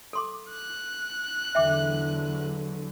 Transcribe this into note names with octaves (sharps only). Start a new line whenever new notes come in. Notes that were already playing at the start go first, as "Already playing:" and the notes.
A4 C6 D6
F#6
E2 D3 F#3 E5 G5 D6